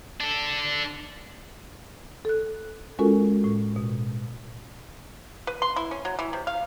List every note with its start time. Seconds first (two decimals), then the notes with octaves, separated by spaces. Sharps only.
0.21 D4 A4
2.25 A4 F#6
2.99 G#3 C#4 F4 F#4 A4 A#4
3.44 A2
3.76 B2
5.47 B4
5.62 C6
5.76 E4
5.91 C#4
6.05 F#3
6.19 E3
6.33 C3
6.47 F5